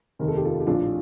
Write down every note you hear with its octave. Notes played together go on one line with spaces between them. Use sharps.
F1 D#2 D#3 A#4
A4
G4
F4 A4
G4
A#1 A2 F3 D4 F4